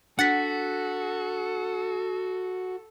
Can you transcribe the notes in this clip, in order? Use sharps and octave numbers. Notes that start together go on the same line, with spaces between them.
D4 F#4 A4 F#5 A6 B6